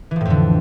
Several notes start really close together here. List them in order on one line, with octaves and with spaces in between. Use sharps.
E3 F3 A2 F2 D3